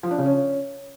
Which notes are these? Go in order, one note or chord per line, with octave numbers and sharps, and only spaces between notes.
F3
D4
C#3
C#4